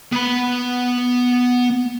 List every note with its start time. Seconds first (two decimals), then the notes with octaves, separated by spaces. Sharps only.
0.13 B3 B5